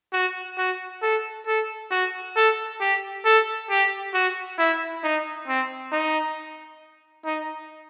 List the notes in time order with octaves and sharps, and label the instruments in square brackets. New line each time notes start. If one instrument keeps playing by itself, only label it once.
[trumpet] F#4
F#4
A4
A4
F#4
A4
G4
A4
G4
F#4
E4
D#4
C4
D#4
D#4